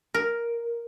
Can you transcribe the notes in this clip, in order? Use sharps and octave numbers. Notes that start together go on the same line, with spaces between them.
A#4